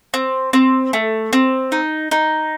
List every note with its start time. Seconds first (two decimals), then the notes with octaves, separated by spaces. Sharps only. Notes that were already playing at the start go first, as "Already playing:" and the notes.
0.14 C4
0.53 C4
0.93 A3
1.33 C4
1.72 D#4
2.11 D#4